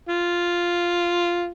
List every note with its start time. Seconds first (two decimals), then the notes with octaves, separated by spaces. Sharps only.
0.09 F4